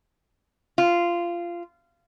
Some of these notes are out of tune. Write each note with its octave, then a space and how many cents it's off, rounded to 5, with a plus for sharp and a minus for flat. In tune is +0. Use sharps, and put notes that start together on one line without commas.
F4 -15